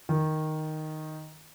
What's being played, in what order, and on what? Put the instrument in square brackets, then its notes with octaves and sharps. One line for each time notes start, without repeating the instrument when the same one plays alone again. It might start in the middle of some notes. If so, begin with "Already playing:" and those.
[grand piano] D#3